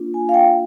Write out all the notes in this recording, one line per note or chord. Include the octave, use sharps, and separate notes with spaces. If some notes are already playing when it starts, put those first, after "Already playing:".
Already playing: A#3 D4 F4
G#5
F5
G5